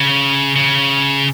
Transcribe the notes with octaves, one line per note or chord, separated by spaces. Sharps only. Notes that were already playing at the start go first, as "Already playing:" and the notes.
Already playing: C#3
C#3